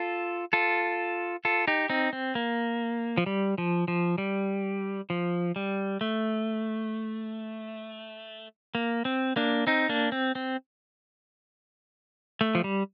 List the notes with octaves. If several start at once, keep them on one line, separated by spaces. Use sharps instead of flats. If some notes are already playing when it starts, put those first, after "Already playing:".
Already playing: F4 A4
F4 A4
F4 A4
D#4 G4
C4 D#4
C4
A#3
F3
G3
F3
F3
G3
F3
G3
A3
A#3
C4
A#3 D4
C4 D#4
A#3 D4
C4
C4
A3
F3
G3